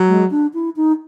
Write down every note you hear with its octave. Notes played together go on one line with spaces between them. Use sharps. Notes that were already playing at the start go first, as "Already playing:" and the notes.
Already playing: F#3
G#3
D4
E4
D#4